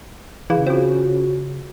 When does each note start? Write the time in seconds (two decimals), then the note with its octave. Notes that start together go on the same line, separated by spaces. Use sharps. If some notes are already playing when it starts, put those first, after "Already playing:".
0.50 C#3 E3 G#4 F5
0.67 C4 F4 F#4 C5